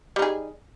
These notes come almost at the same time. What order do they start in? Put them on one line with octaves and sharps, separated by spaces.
G3 D#4 G#4